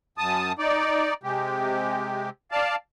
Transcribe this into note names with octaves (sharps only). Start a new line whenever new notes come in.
F#2 A5 D#6
D#4 D5
C3 G#3 G4
D5 F5 A5